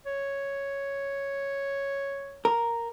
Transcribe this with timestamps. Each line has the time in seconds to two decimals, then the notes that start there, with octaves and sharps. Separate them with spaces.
0.06 C#5
2.45 A#4